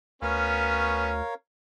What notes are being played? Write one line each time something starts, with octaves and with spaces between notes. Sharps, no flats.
D2 B3 C#4 A#4 C#5 F5